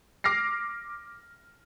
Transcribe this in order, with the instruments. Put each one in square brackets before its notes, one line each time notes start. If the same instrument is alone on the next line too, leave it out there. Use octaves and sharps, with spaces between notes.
[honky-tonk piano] D6 F6 A#6 C7